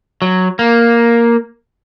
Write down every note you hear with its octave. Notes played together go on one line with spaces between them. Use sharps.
F#3
A#3